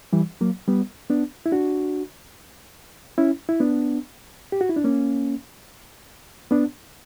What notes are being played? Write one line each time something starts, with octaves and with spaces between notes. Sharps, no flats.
E3 G3
F#3 A#3
G3 B3
B3 D4
E4
D4 F#4
C#4 E4
E4
B3 D4
G4
F#4
E4
D4
A#3 C#4
B3 D4